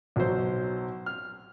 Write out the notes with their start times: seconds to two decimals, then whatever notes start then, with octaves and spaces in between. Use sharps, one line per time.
0.16 B1 F#3 C5
1.06 F6